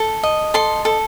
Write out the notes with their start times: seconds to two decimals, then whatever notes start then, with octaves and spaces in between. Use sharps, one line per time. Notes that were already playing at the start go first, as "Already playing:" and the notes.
Already playing: A4
0.23 D#5
0.54 A4 C6
0.85 A4